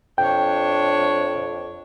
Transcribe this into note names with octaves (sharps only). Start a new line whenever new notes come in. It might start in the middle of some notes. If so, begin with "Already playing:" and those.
F2 D4 C#5 G5